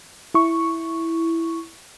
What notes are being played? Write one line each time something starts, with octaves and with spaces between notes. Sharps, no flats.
E4 C#6